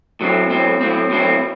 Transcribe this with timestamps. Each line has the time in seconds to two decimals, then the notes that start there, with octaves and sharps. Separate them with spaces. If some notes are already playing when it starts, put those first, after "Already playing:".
0.21 A2 F#3 C4
0.50 A2 F#3 C4
0.81 A2 F#3 C4
1.11 A2 F#3 C4